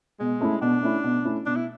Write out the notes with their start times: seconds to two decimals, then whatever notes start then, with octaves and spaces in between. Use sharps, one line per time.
0.20 B2 G#3
0.41 A3 C#4 E4
0.61 B2 D4
0.83 A3 C#4 E4
1.04 B2
1.25 A3 C#4 E4
1.46 B2 D4
1.56 E4